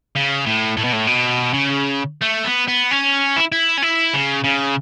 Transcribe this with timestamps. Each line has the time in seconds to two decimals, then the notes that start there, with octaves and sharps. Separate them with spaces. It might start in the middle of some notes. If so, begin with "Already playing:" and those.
0.16 C#3
0.46 A2
0.77 A2
0.84 B2
0.93 A2
1.07 B2
1.53 C#3
2.22 A3
2.45 B3
2.68 B3
2.91 C#4
3.36 E4
3.52 E4
3.78 C#4
3.82 E4
4.14 C#3
4.44 C#3